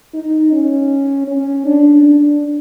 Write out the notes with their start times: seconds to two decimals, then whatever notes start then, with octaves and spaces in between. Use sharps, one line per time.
0.14 D#4
0.52 C#4
1.27 C#4
1.66 D4
2.03 D4